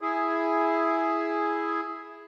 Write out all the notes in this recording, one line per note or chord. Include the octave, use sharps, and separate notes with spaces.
E4 G#4